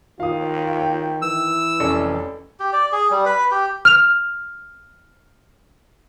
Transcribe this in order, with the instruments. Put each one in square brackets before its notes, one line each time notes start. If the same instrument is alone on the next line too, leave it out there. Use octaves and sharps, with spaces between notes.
[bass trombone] D#3 [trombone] F4 [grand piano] F5 D#6
[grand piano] G5
[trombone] E3 [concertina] E6
[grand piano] F1 A4 D5 [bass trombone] C#4
[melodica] G4
D5
G#4
G3
B4
G4
[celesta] F6 F7